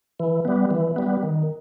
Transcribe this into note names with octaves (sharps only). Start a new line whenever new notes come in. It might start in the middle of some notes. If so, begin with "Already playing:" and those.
E3
G3 B3
E3
G3 B3
D#3